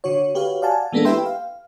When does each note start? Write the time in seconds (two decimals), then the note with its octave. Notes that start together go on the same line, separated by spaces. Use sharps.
0.04 D3 F#4 C#5
0.35 F#4 G4 B4 C#5 F5
0.62 D5 F5 F#5 G#5 A5
0.92 E3 G#3 A#3 B3 D4 A4
1.05 E4 G4 B4 E5 G5 C6
1.26 F5